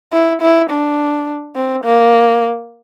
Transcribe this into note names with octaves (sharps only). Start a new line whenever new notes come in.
E4
E4
D4
C4
A#3